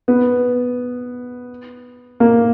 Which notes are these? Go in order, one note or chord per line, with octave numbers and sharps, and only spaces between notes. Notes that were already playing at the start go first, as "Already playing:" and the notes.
B3
A#3